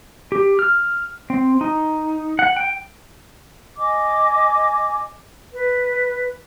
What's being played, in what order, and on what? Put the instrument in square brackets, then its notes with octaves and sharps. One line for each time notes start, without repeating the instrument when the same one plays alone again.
[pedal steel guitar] G4
F6
C4
D#4
F#5
G5
[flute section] D#5 G#5 D6
B4